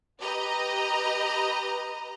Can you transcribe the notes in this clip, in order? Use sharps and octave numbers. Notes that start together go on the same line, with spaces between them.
G4 B4 D#5 A#5